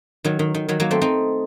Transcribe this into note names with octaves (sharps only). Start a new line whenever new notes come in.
D#3 F#3
D#3
D#3
D#3 F#3
F#3 A#3
A3 C4
C4 D#4